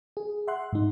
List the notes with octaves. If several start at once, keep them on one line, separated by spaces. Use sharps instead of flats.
G#4
E5 F#5 C6 F#6
G#2 D#4